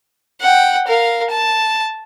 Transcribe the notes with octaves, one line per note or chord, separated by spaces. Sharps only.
F#5 G5
A#4 F5
A5